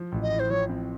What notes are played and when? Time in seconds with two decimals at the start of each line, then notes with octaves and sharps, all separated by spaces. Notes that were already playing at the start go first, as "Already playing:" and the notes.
Already playing: F3
0.12 A1
0.22 D#5
0.31 A2
0.39 C5
0.50 F3 C#5
0.69 C4